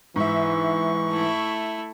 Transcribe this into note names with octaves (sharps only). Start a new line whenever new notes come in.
G#2 E3 E5 C#6
A3 E4